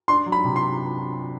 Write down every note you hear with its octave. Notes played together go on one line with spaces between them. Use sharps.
D4 C6
F#3
B5
C3
C6